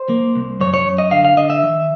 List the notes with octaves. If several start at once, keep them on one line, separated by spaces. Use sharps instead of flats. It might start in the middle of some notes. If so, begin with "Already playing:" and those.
Already playing: C5
A#3
C2
F#2 C#5
C#5
F#2
D#5
D3 F5
F5
D3 D#5
E5
D#3